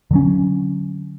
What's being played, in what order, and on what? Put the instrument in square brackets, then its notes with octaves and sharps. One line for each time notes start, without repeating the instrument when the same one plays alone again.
[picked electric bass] D3 F#3 C#4